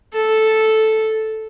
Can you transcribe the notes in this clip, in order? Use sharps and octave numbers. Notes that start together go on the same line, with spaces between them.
A4